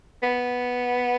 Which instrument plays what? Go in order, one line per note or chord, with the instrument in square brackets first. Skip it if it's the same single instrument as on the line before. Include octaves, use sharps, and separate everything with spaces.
[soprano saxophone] B3